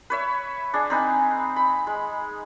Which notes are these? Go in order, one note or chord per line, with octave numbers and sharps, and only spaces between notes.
B4 C#5 E5
D4 G#4
C4 D#4 B4 G#5
B5
G#3